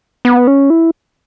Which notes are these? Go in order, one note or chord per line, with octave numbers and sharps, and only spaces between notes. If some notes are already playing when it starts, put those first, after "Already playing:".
B3
C#4
E4